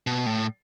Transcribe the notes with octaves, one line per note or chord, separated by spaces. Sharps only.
B2
A2